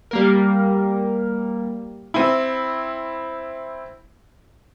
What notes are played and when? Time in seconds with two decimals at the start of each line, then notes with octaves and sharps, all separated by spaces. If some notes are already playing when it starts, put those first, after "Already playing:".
0.11 G3 A#3 A#4
2.14 C4 E4